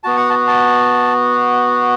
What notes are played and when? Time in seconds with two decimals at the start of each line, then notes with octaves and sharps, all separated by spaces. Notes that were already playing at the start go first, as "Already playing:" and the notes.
0.04 B3 F#4 A5
0.17 F#5
0.30 A5
0.48 A5